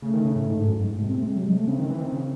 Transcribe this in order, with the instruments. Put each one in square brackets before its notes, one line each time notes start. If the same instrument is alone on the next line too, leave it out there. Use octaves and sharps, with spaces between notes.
[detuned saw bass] C#3 [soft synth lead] A3
[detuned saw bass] D#3
C#3
A2
G#2
G#2
F#2
G#2
A2
[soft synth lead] A3
[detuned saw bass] C3 [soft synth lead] G#3
[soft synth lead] C4
A3
G#3
F#3
G#3
A3
[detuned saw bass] C#3 [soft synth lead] C4
[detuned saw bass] D#3
E3
D#3
C#3